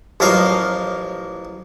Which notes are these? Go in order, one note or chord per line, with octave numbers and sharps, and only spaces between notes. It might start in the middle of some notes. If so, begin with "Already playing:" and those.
A1 F3 F#3 A#4 D#5 F5